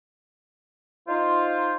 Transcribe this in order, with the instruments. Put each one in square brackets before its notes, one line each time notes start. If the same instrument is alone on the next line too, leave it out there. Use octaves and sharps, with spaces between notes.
[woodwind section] D#4 F4 C5